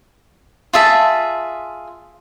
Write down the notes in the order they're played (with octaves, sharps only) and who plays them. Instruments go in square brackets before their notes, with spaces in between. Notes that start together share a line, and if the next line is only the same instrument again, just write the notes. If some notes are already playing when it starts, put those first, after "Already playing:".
[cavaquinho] F4 G#4 E5 A5